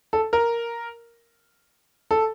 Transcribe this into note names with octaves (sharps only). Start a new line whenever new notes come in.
A4
A#4
A4